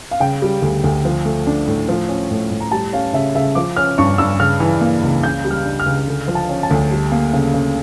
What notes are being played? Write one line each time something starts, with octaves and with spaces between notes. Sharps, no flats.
F5
C#3 G5
G3
D2
D2
F3
A3
D4
A2
F3
C#4
A2
A2
A#5
G3 A5
C#4 F5
C#3 E5
C#3 E5
F3 D6
C#4 F6
G2 C#6
G2 E6
C#3 F6
E3
A#3
C#2
C#3 G6
G3
F6
D4
F6
C#2
D3
F3
A5
C#4
A5
D2
G3
A#3
C#3
C#3